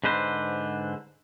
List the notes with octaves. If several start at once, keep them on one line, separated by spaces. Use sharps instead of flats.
G#2 D3 B4 C5